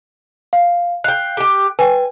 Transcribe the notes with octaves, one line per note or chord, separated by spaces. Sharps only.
F5
F5 G5 F#6
G4 G5
B4 G5 G#5